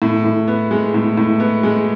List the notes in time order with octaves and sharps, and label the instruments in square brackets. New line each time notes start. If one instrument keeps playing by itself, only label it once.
[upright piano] A2
A2
B3
G#3
A2
A2
B3
G#3